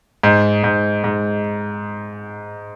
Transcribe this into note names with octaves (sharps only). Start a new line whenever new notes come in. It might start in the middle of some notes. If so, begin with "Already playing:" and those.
G#2
G#2
G#2